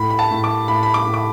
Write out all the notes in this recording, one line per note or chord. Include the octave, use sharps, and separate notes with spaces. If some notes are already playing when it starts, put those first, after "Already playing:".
Already playing: A2 B5
B5
A5
A2
D6
A2 B5
B5
D6
A2
D6